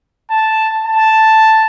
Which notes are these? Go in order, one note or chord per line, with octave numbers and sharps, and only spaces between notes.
A5
A5